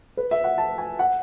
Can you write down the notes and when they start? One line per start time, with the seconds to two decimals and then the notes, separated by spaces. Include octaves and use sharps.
0.17 B4
0.31 E5
0.44 F#5
0.58 A5
0.78 G#5
0.99 F#5